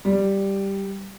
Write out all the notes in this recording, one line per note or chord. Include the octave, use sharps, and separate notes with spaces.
G3